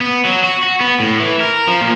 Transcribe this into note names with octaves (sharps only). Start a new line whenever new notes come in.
B3
F#3
F#4
F#4
B3
A2
E3
A#4
F3
A#2